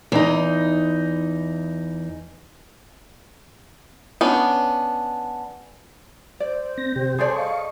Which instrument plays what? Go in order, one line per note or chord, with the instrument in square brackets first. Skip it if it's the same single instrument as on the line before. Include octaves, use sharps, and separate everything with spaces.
[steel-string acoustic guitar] E2 D#4
[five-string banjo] B3 C#4 D4
[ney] C5 [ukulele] D5
[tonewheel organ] C4 A#6
C3 G4
[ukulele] G#4 A4 D5 [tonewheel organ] C#5 G#5 C6
[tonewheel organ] D#5 C#6 [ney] F5